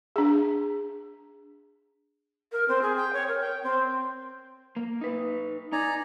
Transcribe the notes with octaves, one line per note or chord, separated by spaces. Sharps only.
D4 G#4
A#4
C4
G#4
G5
C#5
A#4
G5
C4
A#3
D#4 B4
D#4 D5 G#5 A#5